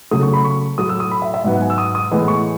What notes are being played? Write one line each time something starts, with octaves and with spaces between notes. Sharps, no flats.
C#3 F#3 A3 D#6
C#6
B5
C#6
A2 F#3 A3 D#6
E6
D#6
B5
E5
E5
G#2 F#3 B3 E5
F#5
G#5
E6
D#6
D#6
A2 E3 G#3 B3
C#6